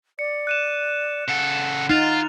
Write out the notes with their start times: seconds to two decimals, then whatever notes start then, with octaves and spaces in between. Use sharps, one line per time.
0.19 D5 C#7
0.47 F#6 D#7 E7
1.28 C#3 A4 F#5
1.90 D#4 F4 F6 A6 F7